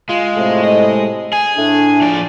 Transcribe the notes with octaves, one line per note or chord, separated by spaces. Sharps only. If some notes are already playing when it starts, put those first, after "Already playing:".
G#3 F4
A2 C3 A3
D#5
G#4 G#5
A2 A3 D4
F3 D5